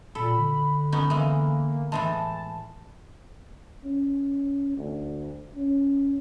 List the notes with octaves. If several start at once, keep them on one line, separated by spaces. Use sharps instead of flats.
A#2 A4 B5
D3
B3 C#4 D#4
E3 G#3 A#3
A2 E3 G#3 A5
C#4
D2
C#4